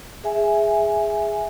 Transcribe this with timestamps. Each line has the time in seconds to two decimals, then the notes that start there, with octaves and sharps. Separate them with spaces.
0.24 G#4 E5 G#5